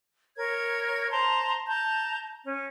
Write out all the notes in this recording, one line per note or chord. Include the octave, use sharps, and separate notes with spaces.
A#4 C#5 G#6
C5 A5 A#5 C6
A5 A#5 G6
C#4